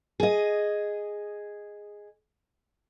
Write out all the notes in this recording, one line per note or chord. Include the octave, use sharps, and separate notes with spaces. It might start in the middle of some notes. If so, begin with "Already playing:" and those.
G#4 D#5